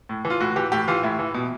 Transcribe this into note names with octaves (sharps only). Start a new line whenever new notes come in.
A2
E3
F4
A2 F#4
E3 G4
A2 G4
E3 F4
A2 E4
E3
B2